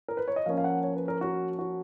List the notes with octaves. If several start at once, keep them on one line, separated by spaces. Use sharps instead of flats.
A#4
B4
C#5
D#5
F3 A#3 C#4 F5
F5
F#5
C#5
B4
A#4
F#4
F#4